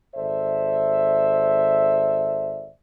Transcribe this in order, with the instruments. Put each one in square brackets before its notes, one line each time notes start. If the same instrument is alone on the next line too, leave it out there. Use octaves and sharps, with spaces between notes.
[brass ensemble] G#1 A4 C5 D5 E5